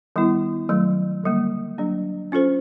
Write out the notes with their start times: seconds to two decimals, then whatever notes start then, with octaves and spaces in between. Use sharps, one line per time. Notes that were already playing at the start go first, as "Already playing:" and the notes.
0.16 D#3 G3 B3 E4
0.69 D#3 F#3 A3
1.24 D3 G3 A#3
1.78 F#3 A#3 D4
2.32 C#4 F4 A4 C5